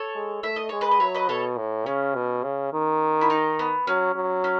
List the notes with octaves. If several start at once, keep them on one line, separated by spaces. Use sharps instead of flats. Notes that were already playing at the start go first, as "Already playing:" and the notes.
Already playing: A4 C#5
G#3
A3 E5
D#5
G#3 C#5
B4 D#5
D#5
F#3 C#5 E5
B4 D#5
B2 A4 C#5
A2
C#3 C#4
B2
C#3
D#3
E4
D#4
B3
F#3 C#4
F#3
C#4